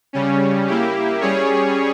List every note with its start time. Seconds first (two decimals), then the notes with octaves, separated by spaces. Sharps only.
0.13 C#3 G3 C#4
0.67 A#3 E4 G4
1.20 G3 C#4 G#4 C#5